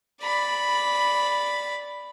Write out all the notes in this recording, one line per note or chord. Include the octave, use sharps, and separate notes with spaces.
D5 B5